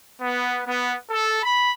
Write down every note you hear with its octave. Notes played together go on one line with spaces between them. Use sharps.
B3
B3
A4
B5